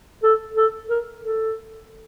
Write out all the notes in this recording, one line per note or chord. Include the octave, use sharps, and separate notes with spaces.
A4
A4
A#4
A4